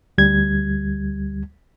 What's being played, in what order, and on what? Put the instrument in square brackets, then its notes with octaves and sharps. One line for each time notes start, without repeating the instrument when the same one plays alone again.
[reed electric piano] D2 G3 G#6